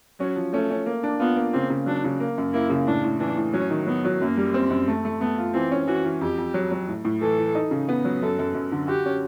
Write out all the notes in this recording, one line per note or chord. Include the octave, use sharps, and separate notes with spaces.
F#3 C#4
F3
A3 C#4
C#4
A#3
D4
B3 F4
A#3
C#3 C4
C#3
F#3 D4
C#3
A#3
F#2
A#3 E4
C#3
A2 D4
A2
E3 D4
A2
F#3 C#4
D#3
F#3 B3
F#3
F#2 A#3
G3
C4
F#2
A3
A3
A3 B3
F4
E3 C4
C#4
E3 F#4
E3
F2 G4
F2
F#3
F#3
A2
A2
E3 A4
E3
D#4
C#3
B3
F#3
F#2 A4
F#2
F#2
D3
F#4 G4
C#4